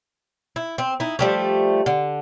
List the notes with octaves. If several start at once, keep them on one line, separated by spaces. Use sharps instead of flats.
E4
C4
D#4 E4
F3 G3 A3
D3